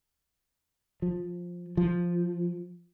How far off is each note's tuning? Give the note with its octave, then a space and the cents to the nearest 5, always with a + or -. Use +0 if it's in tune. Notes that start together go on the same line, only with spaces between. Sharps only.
F3 +10
F3 +0